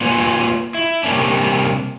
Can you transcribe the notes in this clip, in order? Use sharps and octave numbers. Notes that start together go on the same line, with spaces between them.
A#3 F4 B4 C#5 G#5
E4
C3 G3 A#3 C#4 D4